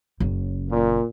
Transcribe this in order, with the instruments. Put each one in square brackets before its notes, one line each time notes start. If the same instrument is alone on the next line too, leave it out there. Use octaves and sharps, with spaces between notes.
[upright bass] F#1 C#3
[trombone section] A#2